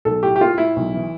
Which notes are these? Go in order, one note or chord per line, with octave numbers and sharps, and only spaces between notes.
B1 A4
A2 G4
G4
A2 F4
A2 E4
B1
E3